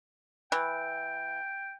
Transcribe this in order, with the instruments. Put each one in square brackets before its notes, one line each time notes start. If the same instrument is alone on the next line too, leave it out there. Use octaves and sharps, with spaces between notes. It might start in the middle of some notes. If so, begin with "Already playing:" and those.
[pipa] E3 [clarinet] G5